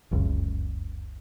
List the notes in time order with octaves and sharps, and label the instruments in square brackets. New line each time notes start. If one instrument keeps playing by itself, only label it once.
[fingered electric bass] F1 C#2 F#2 C#3